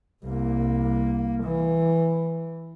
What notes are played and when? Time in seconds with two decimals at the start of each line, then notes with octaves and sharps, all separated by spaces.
0.25 C2 A#3
1.43 E3